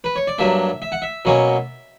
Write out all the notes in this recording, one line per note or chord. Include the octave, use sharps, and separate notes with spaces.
B4
C#5
D5
G2 F#3 A#3 D4 E5
E5
F#5
E5
B2 F#3 A#3 C#4